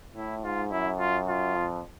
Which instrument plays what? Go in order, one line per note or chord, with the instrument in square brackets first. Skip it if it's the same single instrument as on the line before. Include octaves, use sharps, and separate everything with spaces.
[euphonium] A2 [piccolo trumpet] E4
[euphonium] G#2 [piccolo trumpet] F4
[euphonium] F#2 [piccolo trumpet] E4
[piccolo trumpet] F4
F4
[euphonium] F2